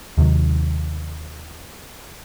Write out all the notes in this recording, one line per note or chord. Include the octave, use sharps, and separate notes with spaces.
D#2 C3 D#3 F#3